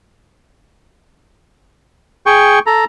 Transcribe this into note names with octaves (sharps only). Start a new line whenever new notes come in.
G#4 G5 C#6
A4 A#5